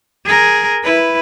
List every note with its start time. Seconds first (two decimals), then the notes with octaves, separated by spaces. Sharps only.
0.25 G#4 A#4
0.84 E4 B4